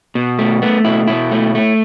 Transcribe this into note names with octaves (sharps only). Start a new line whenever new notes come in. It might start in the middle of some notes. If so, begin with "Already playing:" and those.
B2
A3
A3 B3
B2 E4
B2 E4
A3
A3